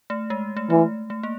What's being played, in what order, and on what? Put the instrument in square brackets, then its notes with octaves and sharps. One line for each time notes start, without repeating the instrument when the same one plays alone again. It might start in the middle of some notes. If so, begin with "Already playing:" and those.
[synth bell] A3
G#3
A3
[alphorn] E3 [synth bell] A3
[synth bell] A3
A#3